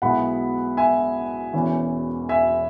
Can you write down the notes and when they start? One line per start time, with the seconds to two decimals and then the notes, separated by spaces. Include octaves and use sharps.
0.02 B1 B2 G#3 B3 E4 F#5 B5
0.77 E5 G#5
1.53 E1 E2 E3 C#4 E4
2.29 E5 G#5